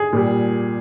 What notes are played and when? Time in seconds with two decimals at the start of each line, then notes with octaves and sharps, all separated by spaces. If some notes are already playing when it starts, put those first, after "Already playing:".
Already playing: G#4
0.13 A#2 G3